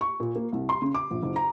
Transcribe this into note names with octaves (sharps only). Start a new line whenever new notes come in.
C#6
A#2
A#3
C2
C6
C#3
D6
A#1
F#1
A#5